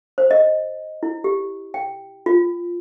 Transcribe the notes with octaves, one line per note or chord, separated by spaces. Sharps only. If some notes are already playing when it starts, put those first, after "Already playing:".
C5
D#5
E4
G4
G5
F4